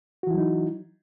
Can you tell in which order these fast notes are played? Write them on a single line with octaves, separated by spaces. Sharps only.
F#4 E3 E4 F#3 D#4